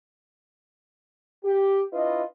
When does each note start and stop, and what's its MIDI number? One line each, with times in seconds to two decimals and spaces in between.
1.44 1.82 67
1.93 2.23 62
1.93 2.23 64
1.93 2.23 65
1.93 2.23 71
1.93 2.23 75